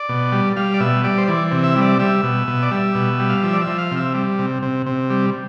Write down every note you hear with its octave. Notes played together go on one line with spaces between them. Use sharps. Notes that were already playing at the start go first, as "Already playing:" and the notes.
Already playing: D5
B2
G3
G3 F5
D5
B2 E5
G3 D5
C5
E3 D5
C3
E5
G3
D5
G3 E5
B2
B2
D5
G3 E5
B2
G3
F5
F3 E5
D5
E5
F3
F5
C3
E5
G3
C3
C3
C3
G3